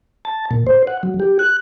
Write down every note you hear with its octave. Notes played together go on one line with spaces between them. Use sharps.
A5
A#2
C5
F#5
F#3
G4
F#6